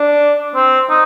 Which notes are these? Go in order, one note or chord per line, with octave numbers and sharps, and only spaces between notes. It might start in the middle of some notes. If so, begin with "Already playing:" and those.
Already playing: D4
C4
D#4